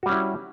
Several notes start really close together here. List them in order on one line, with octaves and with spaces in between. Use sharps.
F#4 G3 C#4 E4